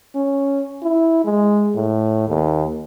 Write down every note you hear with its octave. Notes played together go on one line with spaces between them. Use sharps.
C#4
E4
G#3
A2
D#2